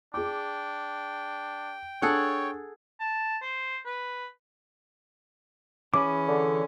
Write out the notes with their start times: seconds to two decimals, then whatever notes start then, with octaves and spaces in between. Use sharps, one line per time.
0.14 D4 G#4 G5 D6
2.02 D4 G#4 A4 C#5 F#5
3.00 A5
3.42 C5
3.86 B4
5.94 E3 C#4 G#4 B5 D6
6.28 D3